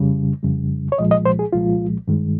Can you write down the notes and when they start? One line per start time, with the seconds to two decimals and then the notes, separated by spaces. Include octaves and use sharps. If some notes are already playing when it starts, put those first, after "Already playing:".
Already playing: F2 C#3 G3
0.43 F2 C#3 G3
0.92 C#5
0.98 C2 A#2 F3 G#3 D#5
1.11 D#5
1.25 C5
1.39 G#4
1.53 C2 A#2 F3 G#3 F4
2.08 G2 D#3 G#3